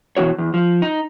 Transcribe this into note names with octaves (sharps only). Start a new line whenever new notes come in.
B2 E3 B3 F#4 C#5
E2
F3
D#4